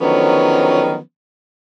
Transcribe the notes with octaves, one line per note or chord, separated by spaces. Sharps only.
D3 D#3 F3 F#3 B3 C#4